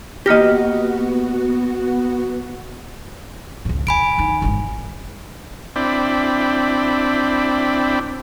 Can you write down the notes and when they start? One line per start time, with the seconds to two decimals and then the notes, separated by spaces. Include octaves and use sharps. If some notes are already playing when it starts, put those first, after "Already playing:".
0.26 A#3 B3 F#4 G4 D#5 F6 A#6
3.65 C#2 A2
3.87 E2 G#5 B5 D7
4.18 D#3 D#4
4.42 G#1 E3
5.76 C4 D4 E4 D5 G5 B5